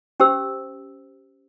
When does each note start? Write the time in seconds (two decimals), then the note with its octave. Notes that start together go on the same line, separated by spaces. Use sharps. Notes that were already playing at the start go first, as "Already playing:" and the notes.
0.20 C#4 G4 C5 E6